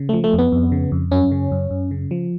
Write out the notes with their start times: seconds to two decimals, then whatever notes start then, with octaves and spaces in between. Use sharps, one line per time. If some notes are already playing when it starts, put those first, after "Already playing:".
Already playing: C#3
0.09 F3 A3
0.24 A3
0.33 F2
0.38 B3
0.52 F2
0.72 C#3
0.92 F2
1.11 F#2 C#4
1.31 C#3
1.52 F#2
1.71 F#2
1.91 C#3
2.11 F3